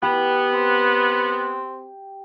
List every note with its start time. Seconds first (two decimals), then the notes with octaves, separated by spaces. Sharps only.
0.03 B3 G4 B4
0.53 C4